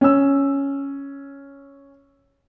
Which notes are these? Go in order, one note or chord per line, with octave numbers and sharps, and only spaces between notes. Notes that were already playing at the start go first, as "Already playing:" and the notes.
C#4 E6